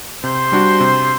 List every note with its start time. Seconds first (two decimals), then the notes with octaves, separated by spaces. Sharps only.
0.24 C3 C5
0.52 G3 D4 F#4
0.80 C3